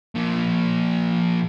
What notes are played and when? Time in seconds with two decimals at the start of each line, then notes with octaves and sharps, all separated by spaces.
0.15 A#2 F3